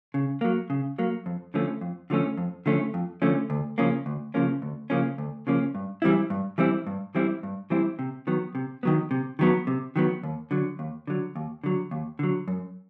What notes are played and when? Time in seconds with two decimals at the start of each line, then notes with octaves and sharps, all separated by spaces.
0.14 C#3
0.41 F#3 A#3
0.70 C#3
0.98 F#3 A#3
1.26 F2
1.54 D3 F3 A3 C#4
1.81 F2
2.10 D3 F3 A3 C#4
2.37 F2
2.66 D3 F3 A3 C#4
2.94 F2
3.22 D3 F3 A3 C#4
3.50 D2
3.78 C#3 F3 A#3 C#4
4.06 D2
4.34 C#3 F3 A#3 C#4
4.62 D2
4.90 C#3 F3 A#3 C#4
5.18 D2
5.47 C#3 F3 A#3 C#4
5.75 G2
6.02 E3 G3 C4 E4
6.30 G2
6.58 E3 G3 C4 E4
6.87 G2
7.15 E3 G3 C4 E4
7.43 G2
7.70 E3 G3 C4 E4
7.99 C3
8.27 D#3 F#3 B3
8.55 C3
8.83 D#3 F#3 B3
9.11 C3
9.39 D#3 F#3 B3
9.67 C3
9.96 D#3 F#3 B3
10.23 D#2
10.51 D3 F#3
10.79 D#2
11.07 D3 F#3
11.36 D#2
11.64 D3 F#3
11.91 D#2
12.19 D3 F#3
12.48 F#2